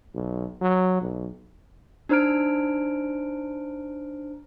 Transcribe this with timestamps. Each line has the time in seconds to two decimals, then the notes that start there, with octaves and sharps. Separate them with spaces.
0.15 B1
0.61 F#3
1.01 B1
2.09 D4 D#4 C5 A#5 F6 D7